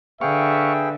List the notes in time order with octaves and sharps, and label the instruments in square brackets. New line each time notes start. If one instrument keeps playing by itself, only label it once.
[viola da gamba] D3 [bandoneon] G#4 G5 [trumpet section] B4 E5 [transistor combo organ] F5 C#6